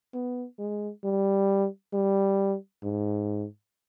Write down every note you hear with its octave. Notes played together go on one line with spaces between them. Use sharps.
B3
G#3
G3
G3
G#2